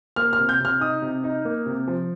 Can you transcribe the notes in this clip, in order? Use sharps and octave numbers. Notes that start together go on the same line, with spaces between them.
A#3 F6
F6
C3
G6
C3
F6
D#4 D#6
C3
D#4
A#3
C3
F3